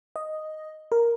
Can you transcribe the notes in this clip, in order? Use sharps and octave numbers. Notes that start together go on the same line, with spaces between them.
D#5
A#4